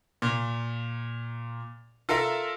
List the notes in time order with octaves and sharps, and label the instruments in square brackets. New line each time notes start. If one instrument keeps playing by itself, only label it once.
[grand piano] A#2
F4 A4 A#4 E5